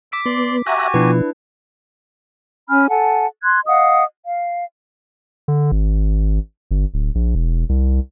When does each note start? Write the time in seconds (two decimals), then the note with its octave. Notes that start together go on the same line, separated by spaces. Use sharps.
0.12 D6 E6 B6 D7
0.25 B3 D5 C6
0.66 F#4 G4 E5 F#5 G#5 A#5
0.94 B2 F3 D4 E4 B4
2.68 C#4 G#5 B5 F6
2.89 A4 F#5 G#5 A5
3.43 C6 F#6 G#6
3.66 D#5 F5 F#5 D#6
4.26 F5
5.48 D3
5.72 G#1
6.71 G1
6.94 D1
7.15 A#1
7.35 E1
7.69 C2